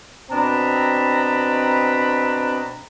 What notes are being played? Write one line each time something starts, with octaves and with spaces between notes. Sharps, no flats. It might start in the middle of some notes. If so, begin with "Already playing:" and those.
B2 C4 D4 D#5 A#5 B5